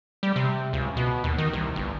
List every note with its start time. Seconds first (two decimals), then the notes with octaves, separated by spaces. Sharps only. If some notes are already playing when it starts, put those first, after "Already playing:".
0.23 G3
0.36 C3
0.73 C#2
0.97 B2
1.24 D#2
1.38 D#3
1.53 C2
1.76 G1